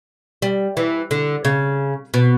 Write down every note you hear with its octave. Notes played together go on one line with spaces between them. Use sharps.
G3
E3
D3
C#3
B2